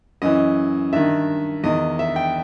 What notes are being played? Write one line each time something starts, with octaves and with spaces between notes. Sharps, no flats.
F#2 E3 D#5
G2 D#3 E5
E2 D#3 D#5
E5
G5